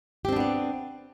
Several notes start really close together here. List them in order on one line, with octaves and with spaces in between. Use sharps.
G4 C4 D4 B3 D5